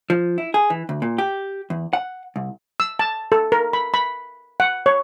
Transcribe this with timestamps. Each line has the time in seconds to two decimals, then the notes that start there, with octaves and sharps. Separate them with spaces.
0.10 F3
0.38 E4
0.54 G#4
0.70 E3
0.89 D2
1.02 A#2
1.18 G4
1.70 E2
1.93 F#5
2.36 C2
2.80 E6
2.99 A5
3.32 A4
3.52 A#4
3.73 B5
3.94 B5
4.60 F#5
4.86 C#5